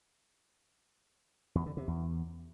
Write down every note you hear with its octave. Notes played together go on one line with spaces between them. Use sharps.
E2
D3
C3
E2